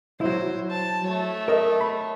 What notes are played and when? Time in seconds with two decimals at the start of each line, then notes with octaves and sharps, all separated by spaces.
0.21 F#3 E4 C5
0.71 A5
1.07 A3 C#5
1.48 A#4 D#5 E5
1.81 B5